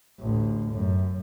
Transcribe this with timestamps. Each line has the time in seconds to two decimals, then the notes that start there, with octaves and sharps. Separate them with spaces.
0.20 A1 D2
0.73 F#2 A2